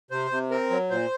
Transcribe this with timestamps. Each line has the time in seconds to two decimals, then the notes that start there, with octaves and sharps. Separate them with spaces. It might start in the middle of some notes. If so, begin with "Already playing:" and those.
0.11 C3 C5
0.31 C3
0.51 C4 A#4
0.70 F#3
0.90 A#2 C5